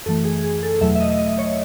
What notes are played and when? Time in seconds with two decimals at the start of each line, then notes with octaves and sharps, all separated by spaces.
0.06 F#2 E3 A3 A4
0.25 G#4
0.44 G#4
0.63 A4
0.81 E2 B2 F#3 A3 E5
0.95 E5
1.00 D#5
1.19 D#5
1.38 C#5